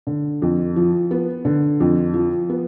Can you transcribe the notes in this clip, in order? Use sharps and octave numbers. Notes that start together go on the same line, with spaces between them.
D3
F2
F3
B3
D3
F2
F3
B3